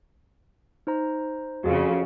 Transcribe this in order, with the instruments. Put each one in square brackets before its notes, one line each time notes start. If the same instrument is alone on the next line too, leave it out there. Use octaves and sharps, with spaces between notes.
[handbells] D#4 C5 A#5
[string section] F2 C#3 [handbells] F#4 G#4 F5